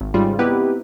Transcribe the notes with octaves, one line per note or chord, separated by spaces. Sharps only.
G#1
G#2 C#3 G3 G#3 F4
B3 C4 D#4 E4 G4 B4